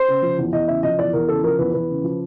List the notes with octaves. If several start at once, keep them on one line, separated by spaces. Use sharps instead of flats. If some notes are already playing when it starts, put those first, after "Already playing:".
Already playing: C5
C#3
F3
E2
E2 D#5
C#3 E5
F3 D#5
E2 D5
E2 A#4
C#3 A4
F3 A#4
E2 B4
E2 B4
C#3
F3